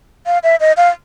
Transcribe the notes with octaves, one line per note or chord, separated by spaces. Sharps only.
F5
E5
D#5
F5